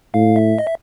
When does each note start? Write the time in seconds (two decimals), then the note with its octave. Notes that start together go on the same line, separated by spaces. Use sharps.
0.14 A2 F5
0.36 E5
0.58 D#5
0.67 E5